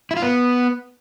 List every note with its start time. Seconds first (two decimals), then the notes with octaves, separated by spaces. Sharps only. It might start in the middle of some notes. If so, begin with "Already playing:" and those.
0.11 E4
0.17 F4
0.22 B3